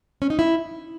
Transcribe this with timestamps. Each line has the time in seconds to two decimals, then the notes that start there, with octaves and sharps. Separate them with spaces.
0.22 C#4
0.30 D#4
0.39 E4